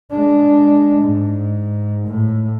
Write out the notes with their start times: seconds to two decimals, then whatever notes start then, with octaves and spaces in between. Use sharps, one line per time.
0.11 G#3 D4
1.00 G#2
2.06 A2